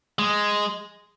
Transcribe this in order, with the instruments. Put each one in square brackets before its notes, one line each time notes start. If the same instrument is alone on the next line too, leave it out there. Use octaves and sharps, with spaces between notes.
[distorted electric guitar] G#3